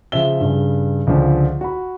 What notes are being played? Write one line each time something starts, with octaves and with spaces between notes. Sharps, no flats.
C#3 F3 E5 G7
G2 C#3
C#2 D3 F3
F#4 B5